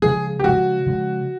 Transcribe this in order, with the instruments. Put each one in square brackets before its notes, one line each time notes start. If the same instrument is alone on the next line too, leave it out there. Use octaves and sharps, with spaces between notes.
[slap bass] C#3 F3 G#3 [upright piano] G#4
[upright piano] G4
[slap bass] C#3 F3 G#3 [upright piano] F#4
[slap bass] C#3 F3 G#3